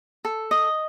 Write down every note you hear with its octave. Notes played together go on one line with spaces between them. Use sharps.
A4
D#5